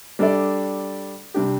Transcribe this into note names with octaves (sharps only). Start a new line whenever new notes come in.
G3 D4 A4 D5
C3 G3 D4 G4